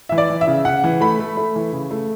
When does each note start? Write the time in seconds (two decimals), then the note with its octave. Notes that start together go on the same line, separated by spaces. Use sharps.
0.09 E3 E5
0.18 D5
0.30 E3
0.41 E5
0.47 C#3
0.65 C#3 F#5
0.84 E3
1.01 A3 B5
1.20 A3
1.37 A3
1.56 E3
1.72 C#3
1.91 A3